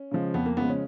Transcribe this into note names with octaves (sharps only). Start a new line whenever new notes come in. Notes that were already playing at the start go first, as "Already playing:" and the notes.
Already playing: C#4
C#3 F3 G#3
F2 B3
A#3
C#3 F3 G#3 B3
C#4